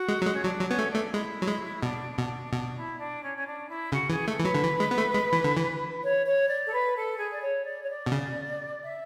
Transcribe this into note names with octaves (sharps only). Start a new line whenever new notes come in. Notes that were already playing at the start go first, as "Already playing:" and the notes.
Already playing: F#4
G#3
F#3
G#3
C#4
F#3 D4
F#3
B3 C#4
A3
D4
A3
G#3 E4
F#3
G#3
B2 D4
B2 D4
B2 D4
E4
D4
C#4
C#4
D4
E4
C#3 F#4
E3 G#4
A3 A4
E3
F#3 B4
D3
E3
G#3
B3
A3
G#3
E3
D3
E3
C#5
C#5
D5
A4
B4
A4
G#4
D5
C#5
D5
C#5
D5
B2
C#3
E5